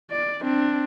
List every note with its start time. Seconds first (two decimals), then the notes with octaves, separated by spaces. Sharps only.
0.11 D5
0.42 C4 D4